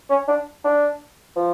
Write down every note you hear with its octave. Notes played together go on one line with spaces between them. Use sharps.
C#4
D4
D4
F3